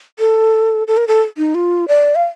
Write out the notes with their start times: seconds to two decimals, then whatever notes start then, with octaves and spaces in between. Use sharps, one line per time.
0.19 A4
0.87 A4
0.97 A#4
1.08 A4
1.37 D#4
1.55 F4
1.88 D5
2.15 F5